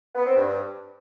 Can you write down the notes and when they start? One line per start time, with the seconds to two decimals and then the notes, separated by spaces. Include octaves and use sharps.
0.15 B3
0.25 C4
0.35 G2